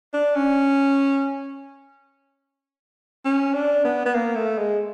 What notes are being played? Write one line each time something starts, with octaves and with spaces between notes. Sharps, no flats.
D4
C#4
C#4
D4
B3
B3
A#3
A3
G#3